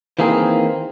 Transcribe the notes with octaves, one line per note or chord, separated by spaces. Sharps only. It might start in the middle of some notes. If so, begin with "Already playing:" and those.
D#3 E3 A#3 C4 G#4